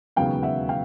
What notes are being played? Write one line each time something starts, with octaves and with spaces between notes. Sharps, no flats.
E1 D#2 C#3 F#3 B3 F5 G5
E5 F#5
F5 G5